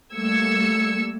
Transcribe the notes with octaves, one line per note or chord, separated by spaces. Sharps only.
G3 A3 A#3 E6 G#6 C#7